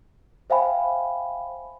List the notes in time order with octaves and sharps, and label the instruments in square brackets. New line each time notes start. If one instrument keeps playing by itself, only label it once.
[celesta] C5 E5 F5 G5 G#5 B5